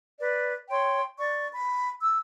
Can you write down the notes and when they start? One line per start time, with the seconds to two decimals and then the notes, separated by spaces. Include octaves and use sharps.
0.20 B4 D5
0.69 C#5 G5 C6
1.18 D5 C#6
1.52 B5
2.02 E6